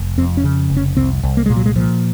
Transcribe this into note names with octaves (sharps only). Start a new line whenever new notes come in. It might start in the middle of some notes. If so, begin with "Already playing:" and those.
Already playing: F1
F2 C4
C#4
C#3
F1
C#4
C2 C4
C2
A#3
A#2 G#3
F#3
G#3
A#2 F3